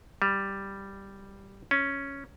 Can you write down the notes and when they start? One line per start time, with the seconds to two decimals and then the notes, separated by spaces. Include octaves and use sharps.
0.22 G3
1.71 C#4